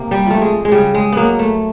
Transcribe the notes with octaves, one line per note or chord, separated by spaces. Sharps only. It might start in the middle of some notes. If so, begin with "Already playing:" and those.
Already playing: C3 A#3
G3
F3 A3
G#3
G#3
C#3 G3
G#3
F#3 A#3 B3
A3